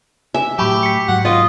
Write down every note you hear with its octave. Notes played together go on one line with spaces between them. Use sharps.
E5 G#5
A2 F#3 G4 A5 B5 C#6
B6 C#7
G#2 F#3 F#5
F4 D#5